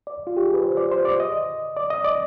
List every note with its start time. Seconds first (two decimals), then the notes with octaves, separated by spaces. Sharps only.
0.07 D5
0.27 F4
0.37 G4
0.45 G#4
0.54 B4
0.63 C5
0.77 D5
0.92 C5
1.05 D5
1.20 D#5
1.77 D5
1.90 D#5
2.04 D5